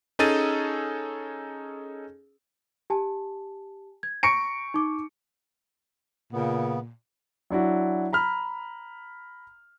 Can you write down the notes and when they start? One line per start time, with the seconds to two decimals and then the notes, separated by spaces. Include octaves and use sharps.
0.19 C#4 D#4 G#4 A4 A6 D#7
2.90 G4 G#5 A5
4.03 G#6
4.23 G#5 A#5 C#6 A#6 C#7 D7
4.74 D#4 D6
6.32 A#2 C#3 B3
7.50 F#3 D4 E4 F#4
8.13 A#5 B5 F6